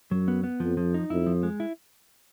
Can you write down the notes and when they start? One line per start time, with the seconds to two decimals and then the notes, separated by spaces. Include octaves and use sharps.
0.11 F#2 F#3
0.28 B3
0.44 B3
0.60 F2 F3
0.77 F3
0.94 D#4
1.10 F2 E4
1.27 F3
1.43 G#3
1.60 E4